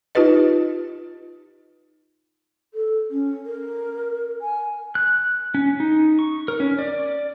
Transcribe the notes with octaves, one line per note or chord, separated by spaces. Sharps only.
D#4 F4 G4 B4 D#5
A4
C#4
A#4
G#5
F#6
C#4
D#4
C#6
A#4
C#4
D5